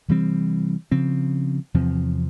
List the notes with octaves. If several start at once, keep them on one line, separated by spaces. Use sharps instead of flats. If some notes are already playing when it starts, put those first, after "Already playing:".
C3 E3 G3 C4
C#3 F3 C4
E2 C3 F3 C4